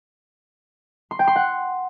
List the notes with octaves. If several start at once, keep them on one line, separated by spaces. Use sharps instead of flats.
C6
G5
C6
F#5